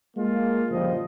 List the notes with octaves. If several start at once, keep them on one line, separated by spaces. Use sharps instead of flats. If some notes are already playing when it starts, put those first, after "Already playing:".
G#3 A#3 F4
F#1 A#2 D3 F3 G3 D#5